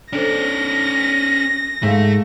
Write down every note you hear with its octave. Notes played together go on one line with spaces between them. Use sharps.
C#4 D4 A4 C5 D5 A#6
G#2 A3 E5 F5